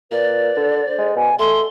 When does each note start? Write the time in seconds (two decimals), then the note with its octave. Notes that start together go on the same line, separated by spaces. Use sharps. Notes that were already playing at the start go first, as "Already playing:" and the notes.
0.11 A#2 B4 D5
0.57 D3
0.85 C5
0.98 G#3
1.16 B2 G#5
1.39 A3 A4 C6